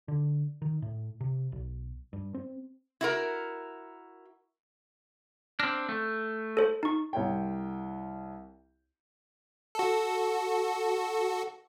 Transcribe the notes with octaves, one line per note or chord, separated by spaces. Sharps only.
D3
D#3
A2
C3
B1
G2
C4
E4 F#4 A#4
C4 D4 F6 F#6 A#6
A3
A4 C5
D#4 C#6
C2 C#5 G5
F#4 A4